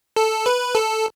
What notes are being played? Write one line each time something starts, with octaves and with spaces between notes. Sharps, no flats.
A4
B4
A4